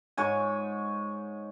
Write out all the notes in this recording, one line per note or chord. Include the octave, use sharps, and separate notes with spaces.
G#2 C#5 G#5